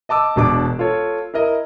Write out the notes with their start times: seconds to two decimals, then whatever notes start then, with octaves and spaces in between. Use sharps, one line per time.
0.09 D#5 A5 D6 E6
0.36 E1 B2 D4 D6 D7
0.79 F4 A4 C#5
1.34 E4 A#4 D#5